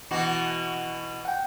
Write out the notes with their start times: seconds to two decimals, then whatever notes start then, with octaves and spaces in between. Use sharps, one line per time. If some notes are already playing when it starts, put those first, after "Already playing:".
0.11 B2 E3 F#4
1.25 F#5 G5